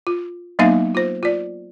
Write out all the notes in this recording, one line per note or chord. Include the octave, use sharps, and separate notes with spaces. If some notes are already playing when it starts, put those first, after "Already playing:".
F4
F#3 A#3 B3 D#4 E5 F5
F4 C5
F4 D5